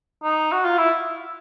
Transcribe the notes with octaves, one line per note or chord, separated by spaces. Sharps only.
D#4
F#4
F4
E4